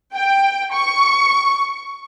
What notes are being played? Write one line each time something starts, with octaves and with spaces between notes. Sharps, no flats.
G5
C#6